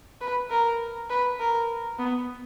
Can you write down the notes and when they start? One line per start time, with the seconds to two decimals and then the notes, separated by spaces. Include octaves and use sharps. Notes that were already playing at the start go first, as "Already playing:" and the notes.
0.21 B4
0.50 A#4
1.10 B4
1.39 A#4
1.99 B3